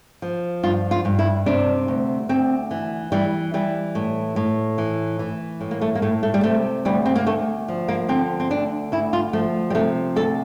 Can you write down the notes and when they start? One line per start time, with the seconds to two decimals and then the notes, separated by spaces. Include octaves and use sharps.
0.22 F3
0.63 G2 F4
0.91 F4
1.05 G2
1.19 E4
1.46 C3 D4
1.88 D2
2.29 D2 C4
2.71 E3
3.12 E3 G3
3.54 E3 G3
3.95 A2
4.36 A2
4.78 E3
5.19 E3
5.61 A2
5.71 A#3
5.81 A3
5.95 A#3
6.02 A2 A3
6.23 A3
6.34 G3
6.43 C3 A3
6.85 D2 G3
7.06 C4
7.16 A#3
7.26 D2 A3
7.68 F3
7.88 A#3
8.09 D3 C4
8.40 C4
8.50 D2 D4
8.92 D2 E4
9.13 F4
9.33 F3 A3
9.70 G3
9.75 C3 A3
10.16 D2 A4